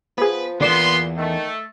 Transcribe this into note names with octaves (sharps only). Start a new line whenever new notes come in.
F3 B3 G#4 B4
E2 G2 A#2 D3 B3 D5 C6 E7
D#3 A3